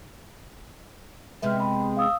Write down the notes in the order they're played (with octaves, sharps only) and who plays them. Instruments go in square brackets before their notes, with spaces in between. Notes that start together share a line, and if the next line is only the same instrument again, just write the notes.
[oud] C3 G#3 B3 [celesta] E5 F6
[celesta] G5 B5
F5 D#6 E6